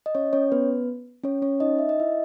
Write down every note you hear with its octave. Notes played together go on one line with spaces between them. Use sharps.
D#5
C#4 C#5
C#4 C#5
B3 B4
C#4 C#5
C#4 C#5
D#4 D#5
E5
D#5
E4 E5